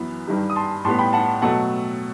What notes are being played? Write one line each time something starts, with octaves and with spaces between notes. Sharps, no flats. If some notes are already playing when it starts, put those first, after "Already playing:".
Already playing: F#2 E3 B3
G2 D#3 G3
D#6
A5 C6
A2 G3 B3 A5 C6
G5 B5
F#5 A5
B2 F#3 A3 F#5 A5